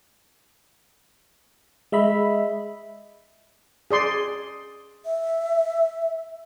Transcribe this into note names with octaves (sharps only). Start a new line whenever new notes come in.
G#3 D#5 E5 B5
G#4 D5 C6
E5